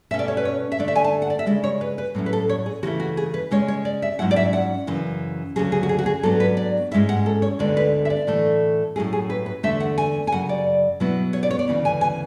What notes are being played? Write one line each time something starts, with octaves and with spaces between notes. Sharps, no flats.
B2 A3 C#4 E5
D5
C#5
B4
C#5
E5
D3 A3 D4 D5
E5
G#5
A5
F#5
D5
E5
C#3 E3 G#3 D5
C#5
B4
B4
A2 F#3 C#4 E4
B4
A4
C#5
G#4
C#3 E3 A3 C#4 E4 F#4
F#4
G#4
B4
C#3 G#3 C#4 C#5
C#5
D5
E5
G#2 F#3 C#4 E4 F#5
D5
E5
F#5
F#2 C#3 E3
D2 C#3 F#3 G#4
G#4
F#4
G#4
F#4
G#4
G#2 F#3 B3 D4 A4
B4
D5
G#2 G#3 C#4 E4 E5
F#5
A4
C#5
D2 D3 G#3 B3 D4 D5
B4
E5
D5
A2 E3 A3
A2 F#3 C#4 E4 G#4
G#4
B4
B4
E2 D3 A3 E5
F#5
G#5
G#5
F#2 C#3 F#3 F#5
D5
B2 F#3 B3 E4
C#5
D5
C#5
D5
D2 C#3 E3 B3
G#5
G#5